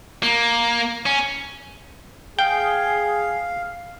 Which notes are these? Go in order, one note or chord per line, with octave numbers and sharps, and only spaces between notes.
A#3
C#4
G#4 F5 G5